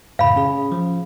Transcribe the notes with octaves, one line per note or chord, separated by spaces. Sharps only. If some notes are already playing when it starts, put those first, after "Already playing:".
F#2 A2 C#3 F5 B5
C#4 G#4
F3